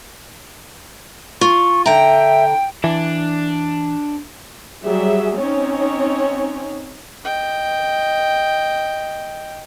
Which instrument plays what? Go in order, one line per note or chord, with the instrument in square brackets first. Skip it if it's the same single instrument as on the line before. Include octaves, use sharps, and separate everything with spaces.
[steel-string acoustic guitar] F4 [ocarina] C#6
[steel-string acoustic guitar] D3 A#5 [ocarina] E5 [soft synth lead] G5
[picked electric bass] E3 [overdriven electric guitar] D4
[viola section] F#3 G3 G#4 E5
C4 C#4 D#4 C#5
[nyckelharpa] D#5 G5